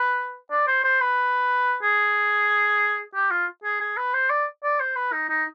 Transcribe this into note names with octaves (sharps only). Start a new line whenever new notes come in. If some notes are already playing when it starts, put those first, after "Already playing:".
Already playing: B4
D5
C5
C5
B4
G#4
G4
F4
G#4
G#4
B4
C5
D5
D5
C5
B4
D#4
D#4